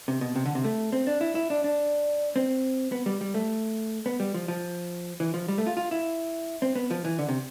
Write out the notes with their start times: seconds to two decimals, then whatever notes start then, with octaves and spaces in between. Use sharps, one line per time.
0.08 C3
0.21 B2
0.36 C3
0.46 D3
0.55 C3
0.64 A3
0.92 C4
1.07 D4
1.21 E4
1.35 E4
1.50 D4
1.64 D4
2.36 C4
2.92 B3
3.06 G3
3.21 G3
3.34 A3
4.06 B3
4.20 G3
4.34 F3
4.48 F3
5.20 E3
5.34 F3
5.48 G3
5.58 A3
5.67 F4
5.77 F4
5.91 E4
6.62 C4
6.75 B3
6.91 F3
7.05 E3
7.19 D3
7.28 C3